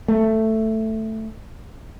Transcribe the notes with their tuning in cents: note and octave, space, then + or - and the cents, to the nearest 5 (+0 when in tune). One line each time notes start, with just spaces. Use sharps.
A3 +5